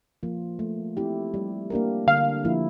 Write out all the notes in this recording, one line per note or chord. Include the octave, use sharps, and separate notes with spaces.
F3 A#3 F4
A3
C4 E4 G4
G3
A#3 D4 G4 A#4
D3 F5
F3 A#3 E4